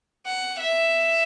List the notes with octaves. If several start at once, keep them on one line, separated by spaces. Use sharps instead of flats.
F#5
E5